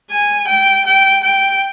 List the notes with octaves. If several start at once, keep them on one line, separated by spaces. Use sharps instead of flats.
G#5
G5
G5
G5